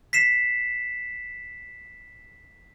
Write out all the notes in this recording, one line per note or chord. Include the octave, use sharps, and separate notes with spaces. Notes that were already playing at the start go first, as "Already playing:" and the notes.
B6 C7 E7